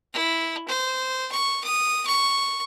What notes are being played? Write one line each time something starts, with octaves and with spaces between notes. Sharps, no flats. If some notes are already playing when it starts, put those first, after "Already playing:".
E4
C5
C#6
D#6
C#6